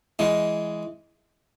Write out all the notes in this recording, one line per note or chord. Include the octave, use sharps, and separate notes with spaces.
E3 G#3